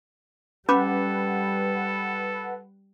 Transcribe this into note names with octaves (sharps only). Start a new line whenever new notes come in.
G3 C#4 A4 B4 F#5 B5 D6